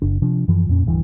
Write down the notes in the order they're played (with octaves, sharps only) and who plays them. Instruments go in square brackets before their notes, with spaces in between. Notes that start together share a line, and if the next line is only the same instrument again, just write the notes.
[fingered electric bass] F#1 D4
C3 F3 D4
F#2 E3 F3
F2 A#2 C#4
D1 G2 E3